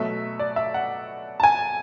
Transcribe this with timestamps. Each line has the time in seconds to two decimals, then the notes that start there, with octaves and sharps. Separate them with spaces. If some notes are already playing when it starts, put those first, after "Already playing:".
Already playing: B2 F#3 A3 E5
0.39 D5
0.56 E5
0.74 F#5
1.40 A5
1.44 G#5